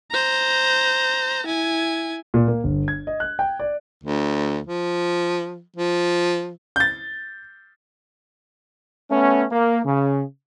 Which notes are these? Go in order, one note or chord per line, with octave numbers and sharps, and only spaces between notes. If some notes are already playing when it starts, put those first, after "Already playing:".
C5 A#5
E4 G#5
A#2
A#3
G1
G#6
D#5
F#6
G5
D5
D2
F3
F3
G6 A6
A3 B3 C#4
A#3
C#3